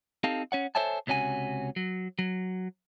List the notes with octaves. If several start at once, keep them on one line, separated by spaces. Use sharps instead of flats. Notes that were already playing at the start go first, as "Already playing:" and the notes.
C4 D#4 G4 A4 F5
C#4 C#5 F#5
A4 C5 C#5 E5 G#5 A5
C#2 C3 C#4 F#4 G#5
F#3
F#3